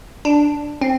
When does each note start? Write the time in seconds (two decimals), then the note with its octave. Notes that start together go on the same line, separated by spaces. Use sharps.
0.25 D4
0.81 C4